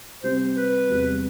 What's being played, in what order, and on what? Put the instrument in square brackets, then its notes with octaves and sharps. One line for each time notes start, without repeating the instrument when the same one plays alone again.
[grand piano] C3 G3 C4 G4 [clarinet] C5
[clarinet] B4
[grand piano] E2 C3 G3